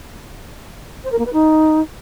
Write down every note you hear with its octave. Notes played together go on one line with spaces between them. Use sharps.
C5
A#4
A#3
B4
D#4